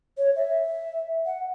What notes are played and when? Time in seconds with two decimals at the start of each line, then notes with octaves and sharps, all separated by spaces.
0.18 C#5
0.36 E5
1.26 F#5